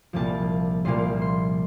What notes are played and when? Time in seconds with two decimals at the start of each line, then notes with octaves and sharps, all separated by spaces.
0.13 C2 A#2 F3 A#3 A5
0.85 C2 A#2 F3 A#3 C6
1.22 C6